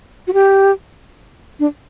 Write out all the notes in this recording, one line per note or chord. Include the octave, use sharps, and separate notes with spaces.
F#4
G4
D4